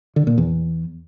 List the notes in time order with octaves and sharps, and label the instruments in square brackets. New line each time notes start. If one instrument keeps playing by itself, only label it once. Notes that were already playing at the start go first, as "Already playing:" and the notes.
[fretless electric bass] D3
A#2
E2